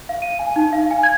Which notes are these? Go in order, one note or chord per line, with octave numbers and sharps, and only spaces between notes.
F5
D#7
G#5
D#4
F5
G#5
G#6